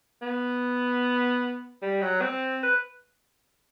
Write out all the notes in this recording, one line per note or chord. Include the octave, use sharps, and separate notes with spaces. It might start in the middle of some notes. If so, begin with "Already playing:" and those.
B3
G3
F#3
C4
B4